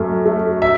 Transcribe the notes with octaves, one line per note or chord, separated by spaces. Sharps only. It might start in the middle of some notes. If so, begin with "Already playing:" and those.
Already playing: F#2 A3
A3
E5